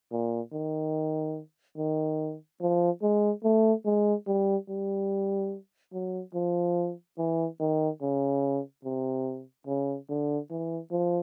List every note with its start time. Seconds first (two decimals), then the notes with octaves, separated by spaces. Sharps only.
0.12 A#2
0.53 D#3
1.77 D#3
2.61 F3
3.02 G#3
3.44 A3
3.85 G#3
4.27 G3
4.69 G3
5.93 F#3
6.34 F3
7.18 E3
7.60 D#3
8.02 C#3
8.85 C3
9.67 C#3
10.09 D3
10.50 E3
10.91 F3